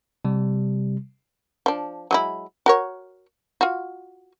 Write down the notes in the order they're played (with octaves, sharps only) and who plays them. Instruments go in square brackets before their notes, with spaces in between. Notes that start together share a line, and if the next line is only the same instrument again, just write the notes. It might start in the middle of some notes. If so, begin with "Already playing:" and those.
[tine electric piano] C3 G3
[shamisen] F3 D4
F#3 G#3 E4
F#4 A#4 C#5
F4 F#4